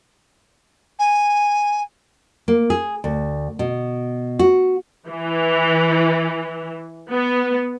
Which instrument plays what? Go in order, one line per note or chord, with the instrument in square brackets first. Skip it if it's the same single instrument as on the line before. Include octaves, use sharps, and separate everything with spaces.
[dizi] G#5
[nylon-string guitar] A#3
G#4
D2
B2
F#4
[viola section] E3
B3